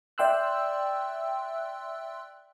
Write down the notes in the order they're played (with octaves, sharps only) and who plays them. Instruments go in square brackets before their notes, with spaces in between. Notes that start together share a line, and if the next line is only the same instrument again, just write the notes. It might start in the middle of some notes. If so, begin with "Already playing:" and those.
[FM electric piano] D5 E5 G5 C6 E6 F#6